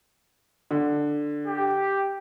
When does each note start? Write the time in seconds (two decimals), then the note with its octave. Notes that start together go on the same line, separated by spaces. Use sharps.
0.71 D3
1.47 G4